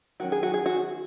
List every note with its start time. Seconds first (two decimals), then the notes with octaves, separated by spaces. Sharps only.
0.20 D#3 F#3 C#4 F#4
0.32 G#4
0.43 F#4
0.54 G#4
0.66 F#4